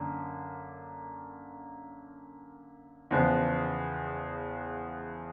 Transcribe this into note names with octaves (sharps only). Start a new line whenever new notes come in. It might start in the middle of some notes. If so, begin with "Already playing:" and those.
Already playing: F#2 D3 A#3
E2 C#3 F3 G#3 B3